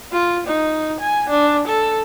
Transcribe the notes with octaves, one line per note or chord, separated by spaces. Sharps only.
F4
D#4
G#5
D4
A4